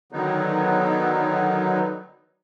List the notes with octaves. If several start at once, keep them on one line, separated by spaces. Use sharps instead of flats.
D3 D#3 F#3 B3 D#4